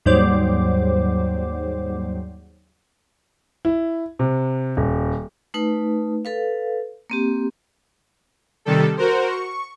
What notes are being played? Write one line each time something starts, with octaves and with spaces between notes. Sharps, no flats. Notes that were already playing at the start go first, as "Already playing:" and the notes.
D#2 G#2 F#3 G3 C5 D6
E4
C3
D#1
A3 D#4 B4
A4 B4 F5
A#3 C4 G4
C3 D#3 G3 A4
F#4 A#4 C5
C#6